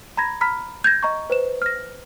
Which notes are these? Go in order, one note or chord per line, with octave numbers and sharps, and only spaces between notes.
A#5 B5 G#6 A#6
A#5 B5 F6 B6
G6 G#6 A#6
D#5 A#5 C#6
B4 C5 E7
F6 A#6